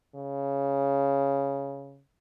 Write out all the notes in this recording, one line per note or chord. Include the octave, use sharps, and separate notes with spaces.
C#3